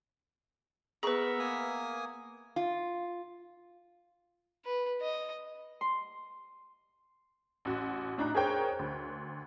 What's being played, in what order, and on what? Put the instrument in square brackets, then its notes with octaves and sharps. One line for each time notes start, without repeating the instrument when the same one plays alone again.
[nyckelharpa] B3 E5 [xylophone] G#4 B4 [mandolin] A#4 A#5 C#6
[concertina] A#3 G#5 D#6
[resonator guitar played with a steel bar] F4
[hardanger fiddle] B4
D#5
[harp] C6
[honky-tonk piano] A1 F#4
A2 D4 D#4 A#5 F#6
G#4 A#4 C5 C#5 G5
D2